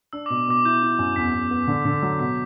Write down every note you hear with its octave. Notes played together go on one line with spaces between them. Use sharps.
D4 E6
B2 D6
B2 D6
E4 G6
E4
F#2
E2 B6
E2
B3
D3
D3
F#3
B2 B6